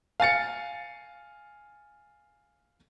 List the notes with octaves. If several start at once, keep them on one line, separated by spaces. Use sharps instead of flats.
F5 G#5 A6 C#7